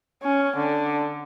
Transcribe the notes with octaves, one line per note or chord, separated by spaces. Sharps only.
C#4
D3